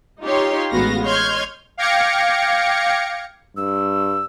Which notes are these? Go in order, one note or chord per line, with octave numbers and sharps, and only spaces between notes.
D#4 F4 G4 C#5 C6
A1 G#3 B3 F#4 F5 A#6
C#5 D#5 C6 F6 G6 G#6
F5 G5 D6 G#6 A#6 C#7
G2 E6